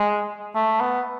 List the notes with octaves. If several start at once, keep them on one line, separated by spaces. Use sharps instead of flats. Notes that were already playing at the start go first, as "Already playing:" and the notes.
Already playing: G#3
A3
B3